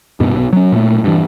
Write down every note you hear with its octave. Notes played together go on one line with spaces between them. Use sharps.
D#1 G2 B2
B1
F#3 C#4
A#2 A3
G2 E3